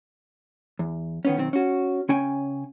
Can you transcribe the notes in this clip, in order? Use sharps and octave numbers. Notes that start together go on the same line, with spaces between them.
E2
D#3 B3 C#4
B1 D#3 C4
C#4 F#4
C#3 C#4 G5 G#5